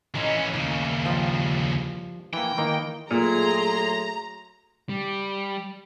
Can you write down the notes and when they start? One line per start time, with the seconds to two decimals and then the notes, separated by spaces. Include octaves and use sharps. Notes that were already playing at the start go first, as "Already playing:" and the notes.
0.15 E3 C#4 D#4 F4
0.53 D#2 C#3 A#3
0.85 E3
1.06 F3 G3 G#4
2.33 E3 F3 A#3 G5
2.58 D#3 E3 A#3 D#4
3.11 A#2 F#3 A3 G#4 A#5 C6
4.89 G3